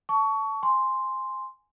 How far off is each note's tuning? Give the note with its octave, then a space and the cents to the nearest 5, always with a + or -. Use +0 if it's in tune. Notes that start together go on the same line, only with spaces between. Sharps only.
A5 +0 C#6 +20
G#5 +0 C6 +0